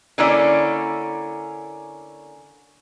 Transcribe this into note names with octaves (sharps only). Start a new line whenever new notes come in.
D3 A#3 C#4 E4 D5